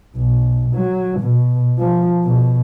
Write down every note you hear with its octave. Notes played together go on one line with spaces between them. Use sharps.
B1
F#3
B2
F3
B2